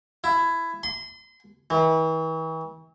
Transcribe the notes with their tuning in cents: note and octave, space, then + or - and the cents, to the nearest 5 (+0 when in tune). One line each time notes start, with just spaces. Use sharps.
E4 +15
C6 -30
E3 -40